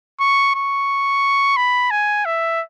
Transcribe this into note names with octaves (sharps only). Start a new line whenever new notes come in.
C#6
C#6
B5
G#5
E5